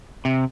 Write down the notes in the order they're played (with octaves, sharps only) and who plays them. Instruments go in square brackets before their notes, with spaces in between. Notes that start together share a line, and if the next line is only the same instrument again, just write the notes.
[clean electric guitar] C3